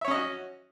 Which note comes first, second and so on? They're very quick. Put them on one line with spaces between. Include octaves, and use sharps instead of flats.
E5 C#5 C#4 D#5 F#4